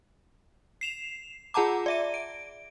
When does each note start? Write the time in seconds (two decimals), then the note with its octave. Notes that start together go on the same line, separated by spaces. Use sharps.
0.81 C7 E7 F7
1.54 F4 G#4 F#5 A5 A#5 D6
1.86 D5 E5 D#7
2.14 D7